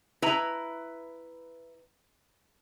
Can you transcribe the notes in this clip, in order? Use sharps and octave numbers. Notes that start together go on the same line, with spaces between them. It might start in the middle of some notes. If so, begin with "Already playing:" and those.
E4 B4 A#5